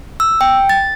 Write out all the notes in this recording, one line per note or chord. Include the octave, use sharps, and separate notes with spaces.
E6
G5
A6